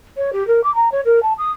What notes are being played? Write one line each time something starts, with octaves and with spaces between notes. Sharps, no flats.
C#5
G4
A#4
D6
A#5
C#5
A#4
A5
D#6